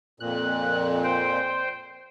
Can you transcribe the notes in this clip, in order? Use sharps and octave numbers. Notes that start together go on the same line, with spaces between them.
F2 A#2 F#6
C5 G5